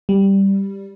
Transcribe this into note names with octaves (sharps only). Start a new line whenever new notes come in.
G3